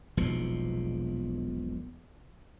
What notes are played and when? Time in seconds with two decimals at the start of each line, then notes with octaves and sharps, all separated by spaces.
0.17 E1 B1 A#2 F3